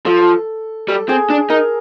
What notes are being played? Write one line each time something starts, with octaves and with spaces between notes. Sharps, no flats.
F3 A4
G3 A4
C4 G#4
D4
D#4 A#4